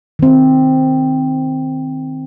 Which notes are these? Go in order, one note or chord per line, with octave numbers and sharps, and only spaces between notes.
D#3 C4